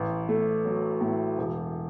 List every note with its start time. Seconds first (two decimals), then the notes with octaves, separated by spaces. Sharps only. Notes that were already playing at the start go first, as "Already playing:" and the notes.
Already playing: A1
0.29 A3
0.65 F#3
1.01 A2
1.38 E1